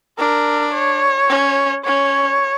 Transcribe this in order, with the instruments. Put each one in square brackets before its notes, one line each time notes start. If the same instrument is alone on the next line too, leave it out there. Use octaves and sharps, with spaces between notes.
[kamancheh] D4 [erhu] A#4
[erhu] C#5
[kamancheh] C#4
[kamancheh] C#4 [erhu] C#5